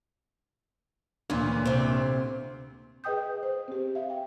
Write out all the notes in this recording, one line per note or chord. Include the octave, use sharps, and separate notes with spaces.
D2 A#2 E3 C#4
C3 C4
G#4 B4 D#5 G5 D#6 G6
C5
C4 G4
E5 F5
G5